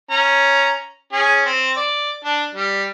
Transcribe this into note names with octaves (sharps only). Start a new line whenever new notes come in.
C#4 A#5
C#4 G#4
C4
D5
D4
G3